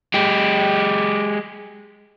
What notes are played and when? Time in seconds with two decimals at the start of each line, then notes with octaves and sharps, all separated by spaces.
0.14 G#3 G4